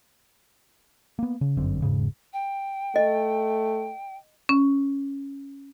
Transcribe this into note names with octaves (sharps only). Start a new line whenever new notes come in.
A#3 B3
C#3
G1 F#2 D3 C4
E1 G#2 C#3
G5
A3 D#5
C#4